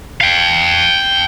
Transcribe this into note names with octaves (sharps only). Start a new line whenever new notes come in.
F5 G5